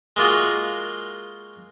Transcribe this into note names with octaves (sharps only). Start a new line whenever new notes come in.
G#3 A#3 F4 F#4